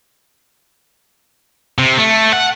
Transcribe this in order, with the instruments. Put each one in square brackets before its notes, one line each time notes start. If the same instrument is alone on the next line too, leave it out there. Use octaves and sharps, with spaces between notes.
[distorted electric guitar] C3
A3
F#5